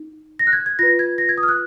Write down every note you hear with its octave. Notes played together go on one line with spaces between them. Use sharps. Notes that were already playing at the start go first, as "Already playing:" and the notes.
Already playing: D#4
A#6
F#6
G#6
G#6
F4 B4 A#6
G#6
A#6
G#6
D#6
F6
F#6